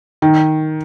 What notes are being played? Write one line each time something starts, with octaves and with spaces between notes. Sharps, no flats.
D#3